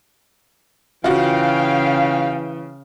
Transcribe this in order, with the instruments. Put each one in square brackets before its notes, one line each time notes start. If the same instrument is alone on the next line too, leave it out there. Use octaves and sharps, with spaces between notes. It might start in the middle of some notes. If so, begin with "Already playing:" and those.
[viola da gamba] C#3 [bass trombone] E3 [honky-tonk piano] F4 F#4 [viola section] F5 G5